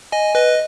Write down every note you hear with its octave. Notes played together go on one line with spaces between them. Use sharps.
D#5 G#5
B4 D#5